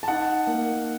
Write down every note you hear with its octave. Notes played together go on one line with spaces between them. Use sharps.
A5
D#4 F#5
A#3